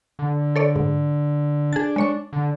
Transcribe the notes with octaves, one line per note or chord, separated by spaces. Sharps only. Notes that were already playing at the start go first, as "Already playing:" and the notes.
D3
A4 C#5 D5
G#2
D4 G#4 A6
G#3 C#5 C#6
D3